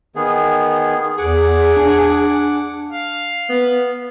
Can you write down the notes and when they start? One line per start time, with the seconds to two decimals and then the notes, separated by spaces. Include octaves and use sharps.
0.15 D#3 B3 G#4
1.18 E2 G#4 F#5 D6
1.76 D4
2.90 F5
3.49 B3